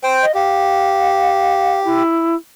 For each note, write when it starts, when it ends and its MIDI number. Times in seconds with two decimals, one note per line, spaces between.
0.03 0.26 72
0.03 0.26 79
0.22 0.32 75
0.35 2.03 67
0.35 1.83 77
1.84 2.35 64